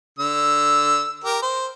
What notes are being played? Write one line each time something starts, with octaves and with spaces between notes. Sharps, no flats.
D3 E6
G4 A#4
C5